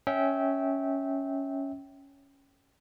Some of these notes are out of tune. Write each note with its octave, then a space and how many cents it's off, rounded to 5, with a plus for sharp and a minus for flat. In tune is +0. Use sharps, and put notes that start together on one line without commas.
C#4 +0 E5 -20 G5 -15